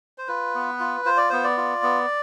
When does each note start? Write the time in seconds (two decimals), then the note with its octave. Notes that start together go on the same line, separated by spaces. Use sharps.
0.18 C5
0.28 F4 B4
0.55 B3
0.80 F4
1.05 F4 C5
1.17 D5
1.30 B3 C5
1.44 D5
1.57 F4
1.83 B3